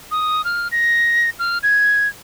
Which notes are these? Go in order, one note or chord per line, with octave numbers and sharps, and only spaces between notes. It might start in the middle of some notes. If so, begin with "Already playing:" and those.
D#6
F6
A#6
F6
G#6